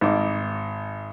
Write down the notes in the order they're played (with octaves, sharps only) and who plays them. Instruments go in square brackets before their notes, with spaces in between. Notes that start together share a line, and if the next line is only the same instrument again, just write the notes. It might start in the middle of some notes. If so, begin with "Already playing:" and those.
[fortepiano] G#1 D#4 D6